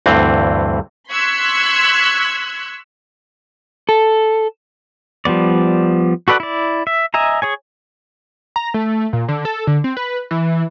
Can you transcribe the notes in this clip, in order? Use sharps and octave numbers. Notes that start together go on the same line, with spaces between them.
D2 G2 E3 C4
C6 C#6 E6 F#6 G#6 B6
A4
F3 G3 B3 D5
F#4 A4 B4 D5 F#5
E4 D5
E5
D#5 E5 G#5 A#5
G#4 C#5 G#5
A#5
A3
A#2
D3
A4
D3
C4
B4
E3